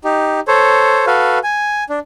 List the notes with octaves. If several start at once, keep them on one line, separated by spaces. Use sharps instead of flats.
D#4 G4
A4 C5 C#5
F#4 A4 B4 F5
G#5
D4